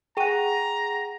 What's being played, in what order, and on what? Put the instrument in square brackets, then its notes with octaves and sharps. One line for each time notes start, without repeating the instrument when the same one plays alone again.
[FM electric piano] G#4 F#5 [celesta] G5 C#6 D#7 [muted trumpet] A#5